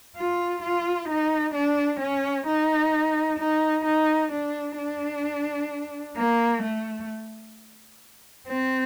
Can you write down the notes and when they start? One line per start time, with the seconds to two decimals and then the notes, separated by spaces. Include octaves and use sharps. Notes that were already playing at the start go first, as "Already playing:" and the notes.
0.16 F4
0.63 F4
1.09 D#4
1.54 D4
2.00 C#4
2.47 D#4
3.39 D#4
3.85 D#4
4.32 D4
4.78 D4
6.17 A#3
6.63 A3
8.48 C4